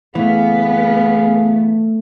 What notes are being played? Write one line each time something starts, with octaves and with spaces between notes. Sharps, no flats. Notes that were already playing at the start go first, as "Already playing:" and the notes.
F#1 E3 A3 B3 G#4 F5